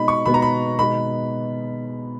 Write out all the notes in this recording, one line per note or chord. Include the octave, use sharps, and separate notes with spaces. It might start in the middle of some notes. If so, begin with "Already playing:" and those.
Already playing: B2 G#3 B3 D#4 B5
C#6
B2 G#3 B3 D#4 B5
A#5
B5
B2 G#3 B3 D#4 B5